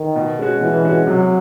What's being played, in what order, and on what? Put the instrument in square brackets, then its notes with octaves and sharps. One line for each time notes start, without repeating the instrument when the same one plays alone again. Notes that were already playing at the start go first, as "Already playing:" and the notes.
Already playing: [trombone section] D#3
[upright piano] B2
G#3 C#4 F#4
[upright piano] B2 [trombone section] E3
[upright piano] G#3 C#4 F#4
[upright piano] C3 [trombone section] F#3